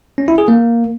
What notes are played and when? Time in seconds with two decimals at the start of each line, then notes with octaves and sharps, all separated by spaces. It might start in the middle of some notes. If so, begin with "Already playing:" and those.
0.18 C#4
0.28 E4
0.38 G#4
0.48 A#3